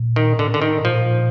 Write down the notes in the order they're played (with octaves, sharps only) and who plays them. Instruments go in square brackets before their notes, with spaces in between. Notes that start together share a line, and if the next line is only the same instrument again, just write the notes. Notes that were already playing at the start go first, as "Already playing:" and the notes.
Already playing: [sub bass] A#2
[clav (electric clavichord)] D#3
[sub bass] A2 [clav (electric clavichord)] D3
[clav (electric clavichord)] D3
D#3
[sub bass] A#2 [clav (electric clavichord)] F3